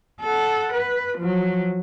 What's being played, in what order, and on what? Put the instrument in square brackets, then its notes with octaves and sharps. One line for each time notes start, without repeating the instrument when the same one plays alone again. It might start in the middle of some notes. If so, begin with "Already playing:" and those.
[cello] A4 F#5
B4
F3 F#3